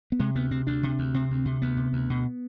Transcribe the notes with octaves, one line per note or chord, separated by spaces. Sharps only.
B3
C3 G#3
D2 B3
C3 C4
D2 D4
C3
D2
C3 C4
D2
C3
D2 B3
C3
D2
B2